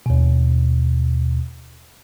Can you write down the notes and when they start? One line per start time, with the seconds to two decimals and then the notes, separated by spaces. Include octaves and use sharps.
0.06 D#2 B2